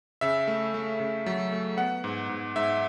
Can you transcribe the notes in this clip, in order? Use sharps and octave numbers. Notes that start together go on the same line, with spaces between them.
C#3 E5
A3
A3
C#3
F#3
A3
B3 F#5
G#2
G#2
G#2 E5